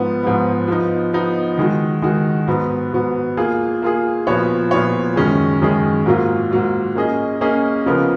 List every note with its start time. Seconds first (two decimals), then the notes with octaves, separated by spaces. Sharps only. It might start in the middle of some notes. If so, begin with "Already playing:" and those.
Already playing: G#2 F3 B3
0.23 G#2 F3 B3
0.68 F3 B3 D#4
1.13 F3 B3 D#4
1.58 D#3 G#3 D#4 F#4
2.02 D#3 G#3 D#4 F#4
2.47 G#2 F#3 B3
2.93 G#2 F#3 B3
3.37 A#3 F4 G#4
3.82 A#3 F4 G#4
4.27 A#2 F3 B3 F#4 C#5
4.71 A#2 F3 B3 F#4 C#5
5.16 F#2 D#3 G#3 C#4 G#4
5.61 F#2 D#3 G#3 C#4 G#4
6.06 G#2 F#3 A#3 F4
6.51 G#2 F#3 A#3 F4
6.95 A#3 C#4 G#4 D#5
7.41 A#3 C#4 G#4 D#5
7.86 C#3 F3 B3 F4 A#4